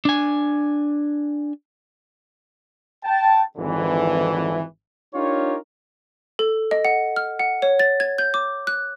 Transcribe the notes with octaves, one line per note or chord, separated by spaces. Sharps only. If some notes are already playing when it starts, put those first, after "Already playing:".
D4 G#5
G5 A5
G#1 F2 D3 E3
D4 D#4 F4 G4 A#4 C#5
A4
D#5
F#5
F6
F#5
C#5
A6
G#6
G6
D6
F#6